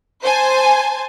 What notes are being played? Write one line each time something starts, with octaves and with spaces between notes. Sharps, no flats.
C5 G#5 A5